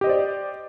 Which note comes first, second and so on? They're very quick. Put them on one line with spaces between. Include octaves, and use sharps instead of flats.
G4 D#5 C5 D5